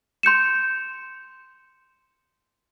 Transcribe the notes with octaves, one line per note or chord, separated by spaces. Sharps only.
C6 G6 C#7 E7